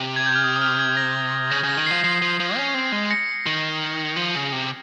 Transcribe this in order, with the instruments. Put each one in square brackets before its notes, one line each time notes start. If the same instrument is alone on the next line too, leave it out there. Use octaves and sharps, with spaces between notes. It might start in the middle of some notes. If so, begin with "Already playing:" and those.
Already playing: [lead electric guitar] C3
[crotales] G#6
G6
F6
D#6
D#6
F6
G#6
A#6
[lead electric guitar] C#3 [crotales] A#6
[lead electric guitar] C#3 [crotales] A#6
[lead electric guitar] D#3
[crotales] C7
[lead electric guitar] F3
[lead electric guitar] F3 [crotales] C7
[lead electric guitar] F3
F3
C#4
C4
G#3
[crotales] A#6 C#7
[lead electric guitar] D#3
F3
C#3
C3